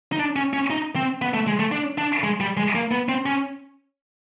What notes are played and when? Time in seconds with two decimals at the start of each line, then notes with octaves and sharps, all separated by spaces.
0.12 D#4
0.19 D4
0.36 C#4
0.53 C#4
0.70 D#4
0.96 C4
1.22 B3
1.34 A3
1.47 G#3
1.59 A3
1.72 D4
1.98 D4
2.23 G#3
2.40 G3
2.57 G#3
2.75 A#3
2.91 B3
3.09 C4
3.26 C#4